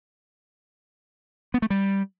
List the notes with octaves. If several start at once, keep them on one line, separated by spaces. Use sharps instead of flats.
B3
A3
G3